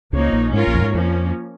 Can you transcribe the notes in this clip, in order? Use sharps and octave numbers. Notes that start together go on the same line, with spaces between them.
C#2 C#3 F3 A#3 D#4 C#5
A#1 A#2
G#2 C#4 F4 A#4 C#5
A#1 A#2
F2
G#2
F2 F3 A#3 C#4